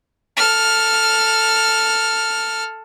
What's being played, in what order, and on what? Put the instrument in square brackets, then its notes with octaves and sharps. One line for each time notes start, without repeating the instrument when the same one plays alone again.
[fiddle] A4 F6